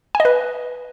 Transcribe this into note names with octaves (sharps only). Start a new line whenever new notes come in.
G#5
D#5
B4